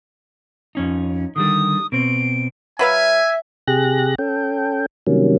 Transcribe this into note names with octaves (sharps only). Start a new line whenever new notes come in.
F2 C#4 D#4
D3 D#3 G3 D#6
B2 C4 D7
F#3 B4 E5 F5 G#5
C3 G4 G#4 F#6 A#6
C#4 A4 G5
C3 D#3 F#3 G3 A#3 C#4